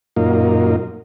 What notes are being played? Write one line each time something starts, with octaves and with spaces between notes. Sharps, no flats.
F#2 A#2 A#3 D#4 F4